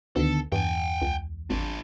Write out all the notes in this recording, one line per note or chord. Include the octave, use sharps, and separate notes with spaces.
D2 D3 D#3 B3 A4
E2 G2 G5 G#5
C#2
G#1 D4 F4